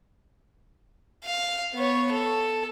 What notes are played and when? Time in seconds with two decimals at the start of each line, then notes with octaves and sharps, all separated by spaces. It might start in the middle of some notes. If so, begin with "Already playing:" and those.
1.24 F5
1.74 B3 C#5
2.11 A4